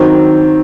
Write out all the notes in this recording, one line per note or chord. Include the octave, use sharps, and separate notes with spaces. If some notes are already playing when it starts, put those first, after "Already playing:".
Already playing: D#3 F#3 C4